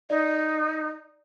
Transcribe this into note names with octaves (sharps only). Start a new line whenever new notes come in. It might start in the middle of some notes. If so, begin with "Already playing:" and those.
D#4 D5